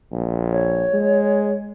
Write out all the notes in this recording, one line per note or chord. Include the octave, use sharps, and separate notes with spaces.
A#1
C#5
G#3